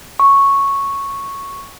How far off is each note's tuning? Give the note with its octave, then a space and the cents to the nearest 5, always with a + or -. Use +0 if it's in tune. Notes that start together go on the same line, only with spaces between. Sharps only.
C#6 -5